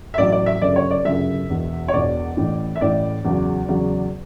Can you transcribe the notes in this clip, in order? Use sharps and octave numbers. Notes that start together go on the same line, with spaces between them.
E5
A1 A2 F#3 D5
D5
E5
G1 F#2 C#3 D5
C#5
D5
G1 F#2 C#3 E5
E1 E2 B2
C#5
E1 E2 B2 D5
A1 A2 E3
E5
A1 A2 E3 D5
E2 C#3 F#3
E2 C#3 F#3